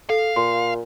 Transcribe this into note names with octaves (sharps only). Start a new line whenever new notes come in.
A4 F5
A#2 C6